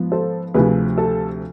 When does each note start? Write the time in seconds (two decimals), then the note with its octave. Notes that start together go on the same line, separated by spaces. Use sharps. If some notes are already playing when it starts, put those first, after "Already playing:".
Already playing: G#2 F3 B3 F4
0.12 A4 C5
0.54 D2 C3 F3 G#4 B4
0.98 A4